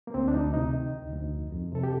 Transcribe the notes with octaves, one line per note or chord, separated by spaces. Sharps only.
A#3
D2 C4
D4
D2 D#4
C3 D#4
D#3
D2
D2
F2
F2
C3 A4
G4